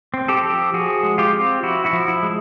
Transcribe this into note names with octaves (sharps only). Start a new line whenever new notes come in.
C4
G4 A4
F3
F3 F#4 G#4
G#3
F4 G4
C4
F3 E4 F#4
E4 F#4
F3
E4
G#3